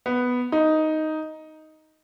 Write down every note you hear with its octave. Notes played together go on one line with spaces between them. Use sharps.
B3
D#4